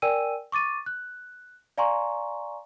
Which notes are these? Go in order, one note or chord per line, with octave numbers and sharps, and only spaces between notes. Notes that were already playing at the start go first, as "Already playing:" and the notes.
A#4 D5 G5 G#5 E6 D#7
C#6 D6 A6 D#7
F#6
D5 F5 G#5 A#5 C6 C#6